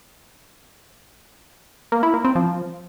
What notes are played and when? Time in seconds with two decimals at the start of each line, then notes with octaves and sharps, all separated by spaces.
1.92 A#3
2.03 E4
2.14 A#3
2.25 C4
2.35 F3